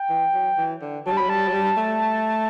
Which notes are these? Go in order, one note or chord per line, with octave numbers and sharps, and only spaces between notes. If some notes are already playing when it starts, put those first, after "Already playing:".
Already playing: G5
E3
F#3
E3
D3
F#3 A5
G3
F#3 B5
G3 A5
F#3
G3
A3